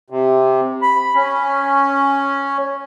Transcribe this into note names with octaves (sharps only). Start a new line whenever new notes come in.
C3
B5
C#4